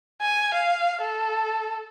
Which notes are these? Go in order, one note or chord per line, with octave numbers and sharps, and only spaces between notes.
G#5
F5
A4